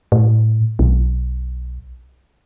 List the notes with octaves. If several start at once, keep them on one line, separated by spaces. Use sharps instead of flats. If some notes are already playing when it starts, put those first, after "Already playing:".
A2
B1